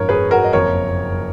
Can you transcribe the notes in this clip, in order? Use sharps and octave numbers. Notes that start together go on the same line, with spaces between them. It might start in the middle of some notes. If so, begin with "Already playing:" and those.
Already playing: G#1 F#2 F3 A#4 C#5
G#4 B4
F#4 A#4
D#5
F#1 F2 F3 A#3 A#4 C#5